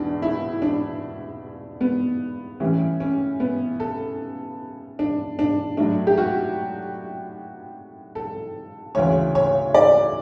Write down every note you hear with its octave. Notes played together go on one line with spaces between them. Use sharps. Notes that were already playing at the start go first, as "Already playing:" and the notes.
Already playing: E2 B2 D4
E4
D4
B3
A2 E3 G3 C#4
C#4
B3
A4
D4
D4
A2 F#3 A3 D4
G4
F#4
A4
D2 C#3 E3 A3 C#5
C#5
D5